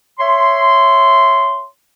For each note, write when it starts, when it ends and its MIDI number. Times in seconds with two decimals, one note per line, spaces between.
0.19 1.64 73
0.19 1.64 76
0.19 1.64 84